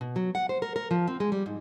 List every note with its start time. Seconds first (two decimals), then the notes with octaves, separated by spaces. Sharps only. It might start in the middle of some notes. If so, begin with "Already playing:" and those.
0.01 B2
0.16 F#3
0.35 F#5
0.49 C5
0.62 A#4
0.76 A#4
0.91 F3
1.08 C4
1.20 G#3
1.32 G3
1.46 G#2